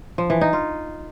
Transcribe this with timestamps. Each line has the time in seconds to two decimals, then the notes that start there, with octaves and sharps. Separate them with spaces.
0.18 F3
0.30 E3
0.41 D#4
0.53 F4